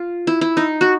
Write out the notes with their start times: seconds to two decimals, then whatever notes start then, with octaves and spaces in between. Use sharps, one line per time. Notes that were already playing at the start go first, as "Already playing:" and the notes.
Already playing: F4
0.27 E4
0.41 E4
0.57 D#4
0.81 F#4